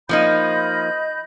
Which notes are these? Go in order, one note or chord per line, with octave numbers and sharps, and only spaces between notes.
F3 A#3 D#4 D#5 B5 G6